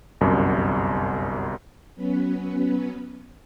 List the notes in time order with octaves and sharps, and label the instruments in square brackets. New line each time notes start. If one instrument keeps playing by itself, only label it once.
[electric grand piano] G1 C2 F#2
[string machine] F#3 B3 C#4 B4